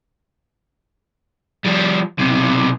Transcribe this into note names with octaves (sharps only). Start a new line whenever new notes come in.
F3 G3
B1 C3